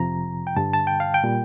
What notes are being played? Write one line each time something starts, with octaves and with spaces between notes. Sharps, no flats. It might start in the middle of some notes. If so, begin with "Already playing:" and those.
Already playing: F2 C3 F3 A#5
G5
G2 D3 G3 A5
A5
G5
F5
G5
A#2 G3